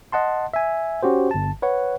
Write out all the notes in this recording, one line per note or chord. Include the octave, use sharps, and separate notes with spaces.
D#5 F#5 A5 C6
E5 G#5
C#4 F#4 G4 C5
G1 A5
B4 C#5 F#5